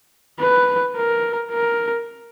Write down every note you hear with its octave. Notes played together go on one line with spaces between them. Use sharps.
B4
A#4
A#4